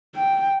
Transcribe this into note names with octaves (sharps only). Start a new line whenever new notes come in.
G5